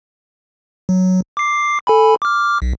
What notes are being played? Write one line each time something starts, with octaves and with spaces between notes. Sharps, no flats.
F#3
D6 C7
A4 G#5 B5
D6 F6
B1